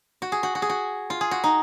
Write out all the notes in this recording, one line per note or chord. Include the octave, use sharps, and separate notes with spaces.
F#4
G#4
F#4
F#4
G#4
F#4
F4
G#4
F#4
D#4